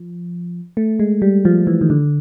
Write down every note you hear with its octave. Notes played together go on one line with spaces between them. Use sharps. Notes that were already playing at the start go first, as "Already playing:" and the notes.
Already playing: F3
A3
G#3
G3
F3
E3
D#3
D3